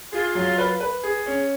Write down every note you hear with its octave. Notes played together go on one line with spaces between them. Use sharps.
F4 G#4
F#3
B4
B4
G#4
C#4